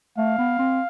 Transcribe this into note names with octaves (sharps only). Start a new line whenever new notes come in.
A3 F5
B3
C4